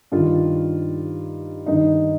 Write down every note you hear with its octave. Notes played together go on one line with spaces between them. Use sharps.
G2 D#3 F4
G2 D#3 D#4